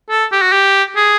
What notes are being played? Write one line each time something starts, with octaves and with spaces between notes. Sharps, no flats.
A4
G4
F#4
G4
G#4